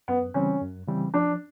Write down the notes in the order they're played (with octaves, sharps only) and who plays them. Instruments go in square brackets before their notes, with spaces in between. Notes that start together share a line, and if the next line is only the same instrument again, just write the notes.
[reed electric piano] F#2 [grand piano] B3
[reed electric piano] C#3 E3 G3 C4 [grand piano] C#4
[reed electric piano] F#2
C#3 E3 G3 C4
[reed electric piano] F3 [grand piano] D4